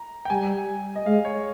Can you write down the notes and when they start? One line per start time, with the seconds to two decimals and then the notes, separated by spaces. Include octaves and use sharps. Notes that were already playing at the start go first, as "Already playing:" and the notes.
Already playing: A#5
0.25 G5
0.30 G3 G#5
0.96 D#5
1.06 G#3 F5
1.25 C#5